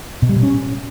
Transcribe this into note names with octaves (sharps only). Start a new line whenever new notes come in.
B2
G3
B2
C#4